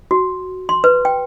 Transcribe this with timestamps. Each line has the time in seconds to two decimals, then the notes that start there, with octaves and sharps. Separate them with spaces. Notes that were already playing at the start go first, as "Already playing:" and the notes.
0.11 F#4
0.69 C6
0.84 B4
1.05 G5